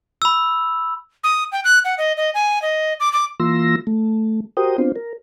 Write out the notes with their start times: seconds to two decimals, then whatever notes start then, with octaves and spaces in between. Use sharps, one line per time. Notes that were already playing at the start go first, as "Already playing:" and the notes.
0.22 B5 E6
1.24 D#6
1.52 G5
1.64 F#6
1.85 F#5
1.98 D#5
2.17 D#5
2.34 G#5
2.62 D#5
3.00 D6
3.13 D6
3.40 E3 A#3 F4 C6 E6 A#6
3.87 A3
4.57 F#4 G4 A#4 C5 G5 D#6
4.78 B3 C4 D4 F4 C5
4.96 A#4